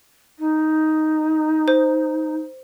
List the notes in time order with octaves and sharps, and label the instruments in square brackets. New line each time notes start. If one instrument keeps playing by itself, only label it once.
[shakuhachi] D#4
[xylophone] C5